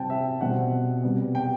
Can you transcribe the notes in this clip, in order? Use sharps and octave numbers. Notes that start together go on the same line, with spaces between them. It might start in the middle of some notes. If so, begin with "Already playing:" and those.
Already playing: C3 G3 C4 G5 A5
E5
B2 G3 C4 F#5
C3 G3 B3
G5